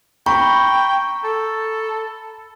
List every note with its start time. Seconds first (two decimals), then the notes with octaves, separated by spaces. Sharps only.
0.26 G5 A#5 B5 C#6
1.24 A4